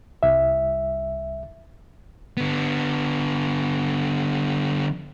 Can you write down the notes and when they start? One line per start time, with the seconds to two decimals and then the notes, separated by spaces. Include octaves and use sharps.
0.23 C2 E5
2.37 D3 B3